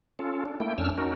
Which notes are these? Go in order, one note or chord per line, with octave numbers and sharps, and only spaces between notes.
C#4 F4 A4
D4
A3 A#3 E4 G5
F2 C#4 D4 E6 F6
C#4 D#4 F#4 A#4